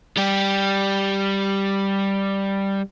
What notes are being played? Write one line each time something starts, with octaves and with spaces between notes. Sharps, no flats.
G3 G4